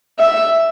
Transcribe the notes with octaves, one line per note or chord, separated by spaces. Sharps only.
E5